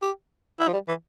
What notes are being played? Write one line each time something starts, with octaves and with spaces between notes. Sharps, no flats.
G4
E4
F3
G3
E3